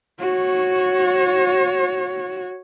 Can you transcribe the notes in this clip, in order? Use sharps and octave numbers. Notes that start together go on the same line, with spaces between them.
F#4 C#5